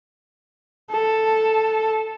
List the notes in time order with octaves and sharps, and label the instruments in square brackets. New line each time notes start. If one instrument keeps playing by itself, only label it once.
[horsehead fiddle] A4